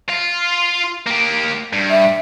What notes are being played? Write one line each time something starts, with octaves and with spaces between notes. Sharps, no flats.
F4
A#3 G4
G2
E5